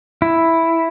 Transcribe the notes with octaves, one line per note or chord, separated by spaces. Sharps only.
E4